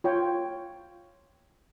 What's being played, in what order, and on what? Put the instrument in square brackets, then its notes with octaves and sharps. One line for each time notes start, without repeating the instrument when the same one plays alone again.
[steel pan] F4 C#5 G5